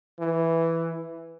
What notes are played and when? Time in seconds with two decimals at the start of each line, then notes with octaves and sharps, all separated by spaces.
0.19 E3